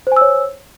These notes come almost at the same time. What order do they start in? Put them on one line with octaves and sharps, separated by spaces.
C5 G#5 E6 C#5